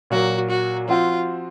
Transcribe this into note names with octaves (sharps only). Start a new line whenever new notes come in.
A#2 F#3 A#3 F#4
F#4
F3 C4 F4 F#4